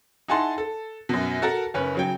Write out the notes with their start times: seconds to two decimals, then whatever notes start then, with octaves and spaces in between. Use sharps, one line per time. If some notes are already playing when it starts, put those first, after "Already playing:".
0.28 D#4 E4 G#4 F#5 A5 C6
0.58 A4
1.09 F#2 B2
1.42 F#4 A4 A#4 A5
1.74 F#1 C#4 B4
1.95 C#3 F#3 G5